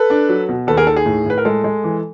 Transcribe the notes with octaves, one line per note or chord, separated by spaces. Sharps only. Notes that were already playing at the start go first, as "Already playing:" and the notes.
Already playing: A4 B4
D4
F#3
B2
D#2 A4 B4
G#4 A#4
D#3 A4
G#4
A2
A2 B4
A#4
G#3 A4
G#3
E3